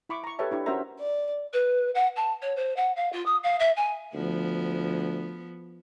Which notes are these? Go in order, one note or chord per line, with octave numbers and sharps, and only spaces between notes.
E4 B5 C#6 D6
A#5 C#6
G4 A4 B4 C#5 E5 A5
D4 E4 G4
C#4 F#4 A#4 C5 E5 A#5
D5
B4
F#5
A5
C#5
C5
F#5
F5
F4
D#6
F5
E5
G#5
D2 F3 B3